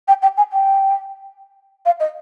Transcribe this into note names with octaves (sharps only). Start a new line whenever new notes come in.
G5
G5
G#5
G5
F5
D#5